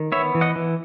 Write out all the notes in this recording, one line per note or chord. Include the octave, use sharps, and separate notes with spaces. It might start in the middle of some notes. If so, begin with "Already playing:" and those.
Already playing: D#3
B3 C#5 E5
E3
D#5 F#5
E3